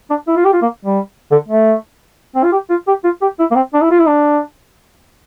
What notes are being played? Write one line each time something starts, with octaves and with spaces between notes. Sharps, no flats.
D4
E4
F4
G4
F4
A#3
G3
D3
A3
C4
F4
G4
F4
G4
F4
G4
E4
A#3
C4
D4
E4
F4
E4
D4